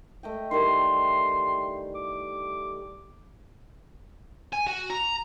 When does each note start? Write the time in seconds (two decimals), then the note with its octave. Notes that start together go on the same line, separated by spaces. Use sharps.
0.23 A3 D#5 G5
0.51 D#3 E3 G3 C6
1.95 D6
4.53 G#5
4.67 F#4
4.90 A#5